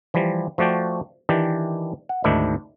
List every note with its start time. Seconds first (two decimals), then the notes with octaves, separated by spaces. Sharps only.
0.14 E3 F3 G3
0.58 F3 A3 F#4 D5 G5
1.29 D#3 E3 D4 G4 D5
2.09 F#5
2.24 D2 G#2 D#3 D4 E4 E5